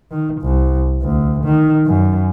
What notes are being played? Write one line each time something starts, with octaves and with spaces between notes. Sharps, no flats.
D#3
C2
D2
D#3
F#2